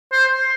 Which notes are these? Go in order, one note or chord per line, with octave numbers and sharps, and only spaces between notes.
C5